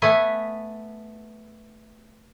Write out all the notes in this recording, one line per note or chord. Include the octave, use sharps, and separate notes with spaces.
A3 B3 G#5